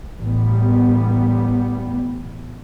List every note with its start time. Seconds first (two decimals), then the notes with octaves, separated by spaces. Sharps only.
0.19 A1 G3 B3